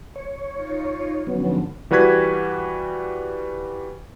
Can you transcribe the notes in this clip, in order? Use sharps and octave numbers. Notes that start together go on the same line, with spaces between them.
C#5
D#4 F4
G#2 D3 F3 F#3 B3 C#4
E3 G3 F#4 B4 G#6 B6